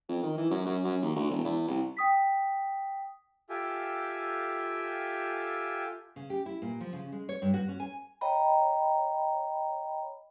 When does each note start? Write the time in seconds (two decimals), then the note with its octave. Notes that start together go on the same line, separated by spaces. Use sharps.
0.09 F2
0.23 D#3
0.37 E3
0.50 F#2
0.67 F#2
0.84 F#2
1.02 D#2
1.16 D2
1.31 E1
1.45 E2
1.68 C2
1.97 G5 D#6 B6
3.50 F4 G4 A4 E5 G5 G#5
6.16 C#3
6.30 G4
6.46 E4
6.62 A#2
6.81 F3
6.93 C#3
7.12 G#3
7.29 C#5
7.42 G2
7.54 F#4
7.68 C#4
7.80 G#5
8.21 C#5 D#5 G5 A#5 B5